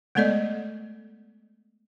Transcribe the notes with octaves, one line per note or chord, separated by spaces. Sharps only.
G#3 A3 B3 A4 D5 D#5